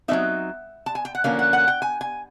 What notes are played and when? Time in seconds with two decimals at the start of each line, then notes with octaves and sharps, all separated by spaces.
0.08 F#3 A3 C4 D#4 E5
0.86 A5
0.95 G#5
1.05 G5
1.15 F#5
1.24 D3 F3 A#3 C#4 F5
1.39 F#5
1.53 F#5
1.68 G5
1.82 G#5
2.01 G#5